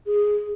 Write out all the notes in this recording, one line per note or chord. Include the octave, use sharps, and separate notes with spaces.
G#4